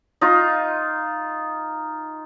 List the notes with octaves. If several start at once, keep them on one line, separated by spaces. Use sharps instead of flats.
D#4 F4